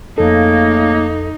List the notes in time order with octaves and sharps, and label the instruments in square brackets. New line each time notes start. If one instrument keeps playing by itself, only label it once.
[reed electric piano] F2 A4 [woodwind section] C#3 A3 A#3 [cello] D#4